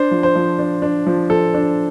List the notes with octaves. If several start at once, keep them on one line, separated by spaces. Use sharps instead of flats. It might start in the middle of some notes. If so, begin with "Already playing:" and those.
Already playing: D4 C5
F3
C5
F3
D4
D4
F3
F3 A4
D4